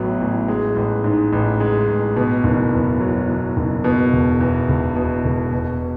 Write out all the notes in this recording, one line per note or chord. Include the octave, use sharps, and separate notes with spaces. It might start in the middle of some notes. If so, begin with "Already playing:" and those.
Already playing: A1 A2 F#3 B3
A1
G#3
A1
G#2
A1
G#3
A1
B2
F#1
E2
F#3
B2
F#1
B2
E1
E2
E1
B2
E1
B2